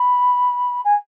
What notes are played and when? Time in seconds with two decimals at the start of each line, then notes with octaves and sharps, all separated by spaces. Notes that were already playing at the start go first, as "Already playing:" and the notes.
Already playing: B5
0.85 G#5